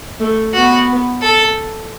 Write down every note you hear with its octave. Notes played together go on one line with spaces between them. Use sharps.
A3
B3 F#4
A4